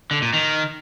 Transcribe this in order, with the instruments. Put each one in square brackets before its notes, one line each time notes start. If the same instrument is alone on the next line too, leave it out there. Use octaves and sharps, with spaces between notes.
[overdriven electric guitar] D3
A#2
D#3